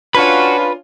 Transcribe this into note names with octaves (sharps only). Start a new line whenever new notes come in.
C#4 D4 F4 F#4 B4 B5